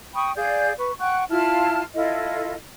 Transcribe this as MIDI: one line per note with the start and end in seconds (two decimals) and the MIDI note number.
0.14 0.31 79
0.14 0.31 83
0.14 0.31 85
0.14 0.31 87
0.35 0.72 68
0.35 0.72 74
0.35 0.72 77
0.35 0.72 91
0.78 0.91 71
0.78 0.91 85
0.99 1.24 78
0.99 1.24 79
0.99 1.24 85
0.99 1.24 90
1.30 1.82 64
1.30 1.82 65
1.30 1.82 81
1.30 1.82 89
1.94 2.54 64
1.94 2.54 65
1.94 2.54 69
1.94 2.54 75